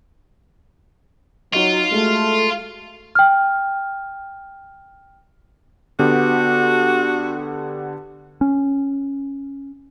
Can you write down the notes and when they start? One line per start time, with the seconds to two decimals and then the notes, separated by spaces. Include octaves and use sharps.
1.53 F#3 D#4 F4 F#4 D#5
1.92 G#3 A3 F#4
3.15 G5 F6
5.99 D3 B3 F#4 G4
8.41 C#4